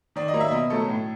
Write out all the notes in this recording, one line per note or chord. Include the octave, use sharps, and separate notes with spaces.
D#3 D5
D#5
F#3 A#3
E5
B2 D#5
F#3 A3 A4
A2